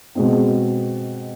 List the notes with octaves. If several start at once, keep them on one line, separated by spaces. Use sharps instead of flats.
B2 G#3 C4